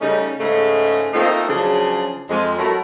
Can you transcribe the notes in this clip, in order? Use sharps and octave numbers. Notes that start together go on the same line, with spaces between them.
C#3 G3 A3 C#4 D#4
G#2 C#3 A3 C#4 A4 D#5
A3 A#3 C4 D#4 F4 A4
C#3 F3 F#3 D4 G#4
F2 G#3
F#3 A3 E4 A4 A#4